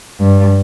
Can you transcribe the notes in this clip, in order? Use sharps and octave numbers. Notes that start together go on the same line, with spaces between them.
G2